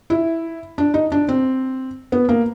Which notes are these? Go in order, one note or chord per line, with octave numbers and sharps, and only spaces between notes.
E4
D4
D#4
D4
C4
B3
A#3